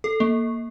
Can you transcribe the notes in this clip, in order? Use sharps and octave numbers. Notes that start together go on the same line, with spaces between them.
A4
A#3